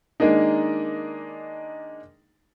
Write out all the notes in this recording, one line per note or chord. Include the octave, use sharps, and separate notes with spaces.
D#3 G#3 A#3 D4 D#4